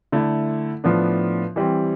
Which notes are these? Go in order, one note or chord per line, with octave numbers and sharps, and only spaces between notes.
D3 A3 E4
A2 F3 B3 D4
E3 G3 C4